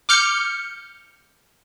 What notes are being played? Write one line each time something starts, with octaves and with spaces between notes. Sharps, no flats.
D6 F6 G6 C#7